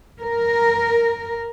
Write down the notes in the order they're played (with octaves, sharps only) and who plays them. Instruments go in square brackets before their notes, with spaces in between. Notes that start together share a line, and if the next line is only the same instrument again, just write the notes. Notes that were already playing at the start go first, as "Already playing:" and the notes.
[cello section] A#4